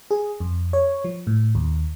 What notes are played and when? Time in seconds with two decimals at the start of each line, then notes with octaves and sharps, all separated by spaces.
0.11 G#4
0.40 F2
0.73 C#5
1.04 F3
1.27 A2
1.55 D#2